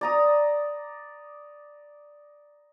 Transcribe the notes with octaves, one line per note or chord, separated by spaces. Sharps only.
D5 A#5 D#6